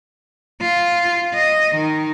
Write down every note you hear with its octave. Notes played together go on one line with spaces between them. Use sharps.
F4
D#5
D#3